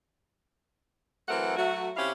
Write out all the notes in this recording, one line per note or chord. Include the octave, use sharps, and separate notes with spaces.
E3 F#3 A3 C4 A#4 F#5
F#3 A3 F#4
C3 C#4 E4 G4 F5